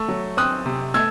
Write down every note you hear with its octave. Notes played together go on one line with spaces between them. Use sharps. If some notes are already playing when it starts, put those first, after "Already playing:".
Already playing: A3 C#6 E6
F#3
C4 D#6 F#6
C3
A3 E6 G#6